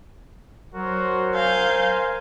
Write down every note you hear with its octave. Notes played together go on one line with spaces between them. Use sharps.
F#3 F#4 A#4 C5
F5 G#5 G6